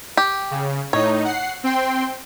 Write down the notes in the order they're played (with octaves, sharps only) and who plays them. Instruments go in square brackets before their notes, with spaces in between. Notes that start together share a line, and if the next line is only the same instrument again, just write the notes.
[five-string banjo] G4
[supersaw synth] C#3
[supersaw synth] A2 D#4 [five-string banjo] C#5
[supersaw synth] F#5 C7
C4 G5 C6